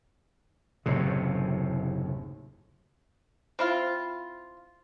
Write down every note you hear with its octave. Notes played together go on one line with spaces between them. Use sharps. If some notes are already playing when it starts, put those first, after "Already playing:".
F#1 D#2 A2 C3
C4 E4 F4